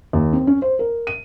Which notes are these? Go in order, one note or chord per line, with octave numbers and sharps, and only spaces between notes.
D#2
C4
C#4
C5
A#4
D#7